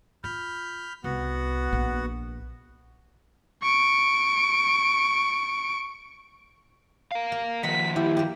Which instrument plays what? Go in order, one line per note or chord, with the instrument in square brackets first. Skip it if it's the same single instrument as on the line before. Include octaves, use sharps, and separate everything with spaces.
[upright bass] F4 [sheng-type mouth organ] B5 F6 G6
[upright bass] C2 [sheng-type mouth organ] B3 F#4 F#5
[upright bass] A#1
[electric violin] C#6 D7
[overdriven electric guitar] A#4 F5
[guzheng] A#3
[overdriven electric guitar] D#3 F3 [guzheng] D#5 F#5 C6 [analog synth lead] B6
[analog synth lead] E4 [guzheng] G4 E5
[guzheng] A#3 G4